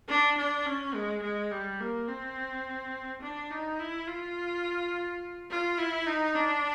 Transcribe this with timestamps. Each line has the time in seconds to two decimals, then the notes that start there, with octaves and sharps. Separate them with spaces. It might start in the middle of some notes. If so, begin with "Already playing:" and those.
0.09 D4
0.38 D4
0.66 C#4
0.95 G#3
1.23 G#3
1.51 G3
1.80 A#3
2.08 C4
3.22 D4
3.51 D#4
3.79 E4
4.07 F4
5.51 F4
5.78 E4
6.07 D#4
6.35 D4